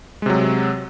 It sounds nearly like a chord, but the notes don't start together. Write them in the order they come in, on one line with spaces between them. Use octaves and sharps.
G#3 C3 F#3